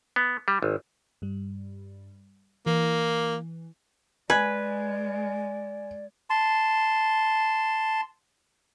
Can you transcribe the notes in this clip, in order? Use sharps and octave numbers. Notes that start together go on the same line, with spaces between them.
B3
G3
G#1
G2 G3
E3 A#3
G#3 B4 D5 G#5 G#6
A5 C6